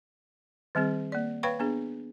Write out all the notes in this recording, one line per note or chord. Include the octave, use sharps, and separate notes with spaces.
D#3 G3 C4 G#4
A#3 D5
B4 C#5 F5 G5 B5 C#6
B3 D4 G#4